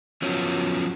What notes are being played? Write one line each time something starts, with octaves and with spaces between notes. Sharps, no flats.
F3 F#3 B3 C#4